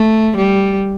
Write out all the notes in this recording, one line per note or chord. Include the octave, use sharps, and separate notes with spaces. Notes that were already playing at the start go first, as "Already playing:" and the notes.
Already playing: A3
G3